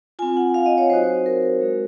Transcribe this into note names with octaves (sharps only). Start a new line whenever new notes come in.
C4 F4 G#5
F#5
F5
D#5
C#5
F#3 C4 D#4 F#4 C5
A#4
G#3 C4 F#4